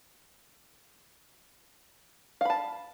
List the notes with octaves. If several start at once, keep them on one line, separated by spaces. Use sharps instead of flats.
F5 A5 B5